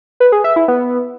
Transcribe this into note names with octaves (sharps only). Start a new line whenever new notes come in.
B4
G#4
E5
E4
B3